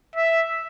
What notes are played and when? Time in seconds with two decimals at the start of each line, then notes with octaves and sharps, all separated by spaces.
0.16 E5